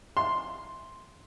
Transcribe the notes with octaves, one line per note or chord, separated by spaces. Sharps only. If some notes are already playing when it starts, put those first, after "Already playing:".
C6